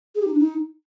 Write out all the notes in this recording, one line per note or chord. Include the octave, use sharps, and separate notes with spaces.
G#4
G4
D#4
D4
D#4